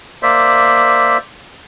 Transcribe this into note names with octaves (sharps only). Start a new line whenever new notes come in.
A#3 C5 D5 E5